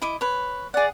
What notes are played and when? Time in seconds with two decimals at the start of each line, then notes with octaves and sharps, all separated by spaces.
0.02 E4 D#5 D6
0.21 B4 C#5
0.74 G#4 D5 F#5